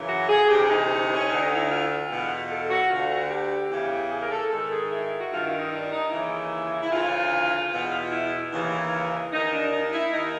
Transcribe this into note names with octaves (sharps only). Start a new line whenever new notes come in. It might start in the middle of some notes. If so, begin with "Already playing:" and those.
Already playing: F#2 C#3 E3
F#4
G#4
D2 C3 E3 G4
D#4
C#4
D2 D3 D4
D#4
E4
F4
E2 B2
A4
F#4
D2 D3 F4
F#4
G4
E2 C#3 E3
G#4
A#4
A4
G#2 D#3 A4
G#4
E4
F#4
G2 D#3 F4
E4
D#4
D4
D#4
D#2 C#3 E3 E4
E4
D2 C#3 E3 F4
E2 B2
E4
D#2 C#3 E3
D#2 D#3 D#4
D4
D#4
E4
D#2 D#3 D#4